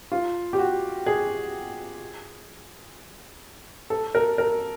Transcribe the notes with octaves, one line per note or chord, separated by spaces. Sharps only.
F4
G4
F#4
G#4
A4
A#4
A#4